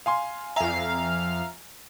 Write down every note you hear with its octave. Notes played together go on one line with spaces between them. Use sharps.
F5 G#5 C6
F2 E5 F5 G#5 A#5